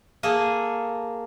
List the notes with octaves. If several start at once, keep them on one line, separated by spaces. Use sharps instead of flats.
A#3 G#4 A4